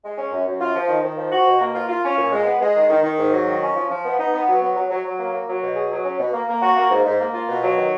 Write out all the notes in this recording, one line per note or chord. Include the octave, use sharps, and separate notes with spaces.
G#3
C#4
F#2
F#2
F4
F3
D#3
D#3
F3
F#4
B2
A#3
F4
F4
C#4
A#2
G#3
B3
G#3
D#3
D#3
D#3
G#2
F#3
D#3
C#4
F3
F3
B3
D#4
B3
F#3
B3
F#3
F#3
F#3
A#3
A#3
F#3
B2
G#4
F#3
C#4
B2
A#3
A#3
F#4
A#3
G#2
G#2
A#3
F4
B2
F#3
D#3